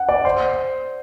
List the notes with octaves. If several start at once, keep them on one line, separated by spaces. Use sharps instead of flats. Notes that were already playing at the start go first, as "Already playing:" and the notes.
Already playing: F#5
D5
C5